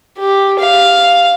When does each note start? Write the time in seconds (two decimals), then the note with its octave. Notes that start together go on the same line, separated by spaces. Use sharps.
0.19 G4
0.59 F5